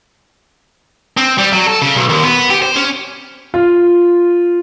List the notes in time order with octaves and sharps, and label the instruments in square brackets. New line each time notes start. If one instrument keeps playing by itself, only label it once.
[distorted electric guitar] C4
G3
F#3
A4
C#3
B1
D#2
B3
G4
C5
C#4
[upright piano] F4